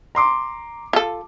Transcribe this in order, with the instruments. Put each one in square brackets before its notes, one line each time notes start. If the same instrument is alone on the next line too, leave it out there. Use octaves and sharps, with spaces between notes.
[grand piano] A#5 C6 D6
[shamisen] F4 A4